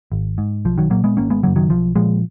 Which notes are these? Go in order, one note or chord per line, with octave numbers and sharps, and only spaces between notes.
G#1
G#2
B1 F3
D#3 F#3
A#2 F#3 A#3
G#3 B3
G#1 A#3 C#4
G#3 B3
F#2 C#3 F#3 A#3
D#3 F#3
B1 F3
A#2 F3 G#3